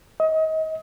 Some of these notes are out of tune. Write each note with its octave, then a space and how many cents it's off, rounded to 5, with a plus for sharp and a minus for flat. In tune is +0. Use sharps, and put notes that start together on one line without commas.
D#5 +30